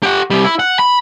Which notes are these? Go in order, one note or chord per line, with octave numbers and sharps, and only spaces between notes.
G4 F#5
C3 G3
E4
F#5
B5